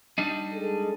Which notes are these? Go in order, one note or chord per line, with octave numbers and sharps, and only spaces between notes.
G3 D4 D#4
G#3 A4